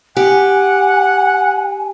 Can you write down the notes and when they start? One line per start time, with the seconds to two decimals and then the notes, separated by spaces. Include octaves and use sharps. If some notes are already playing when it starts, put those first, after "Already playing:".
0.17 G4 F#5 G#5